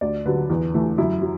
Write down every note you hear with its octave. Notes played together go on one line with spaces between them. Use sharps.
D2 D5
D3 F#3 B4
E2
E3 A3
F#2 E4
F#3